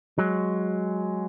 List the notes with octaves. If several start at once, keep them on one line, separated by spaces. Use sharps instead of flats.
F#3 G#3